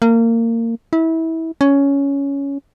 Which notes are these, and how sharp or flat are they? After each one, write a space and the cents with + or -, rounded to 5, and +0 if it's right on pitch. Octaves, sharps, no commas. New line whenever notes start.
A#3 -25
E4 -25
C#4 +10